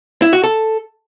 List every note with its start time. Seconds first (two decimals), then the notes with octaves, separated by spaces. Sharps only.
0.22 E4
0.33 F#4
0.44 A4